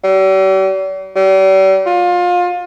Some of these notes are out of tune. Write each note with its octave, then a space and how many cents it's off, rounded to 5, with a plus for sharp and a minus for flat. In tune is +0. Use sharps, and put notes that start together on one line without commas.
G3 -45
G3 -40
F4 +25